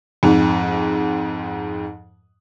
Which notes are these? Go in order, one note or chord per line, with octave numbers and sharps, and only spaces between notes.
F2 G#2